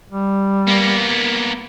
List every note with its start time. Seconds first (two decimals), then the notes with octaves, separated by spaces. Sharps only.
0.10 G3
0.67 A#3 B3